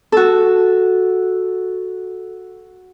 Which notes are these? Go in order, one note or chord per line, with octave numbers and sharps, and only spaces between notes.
F#4 A4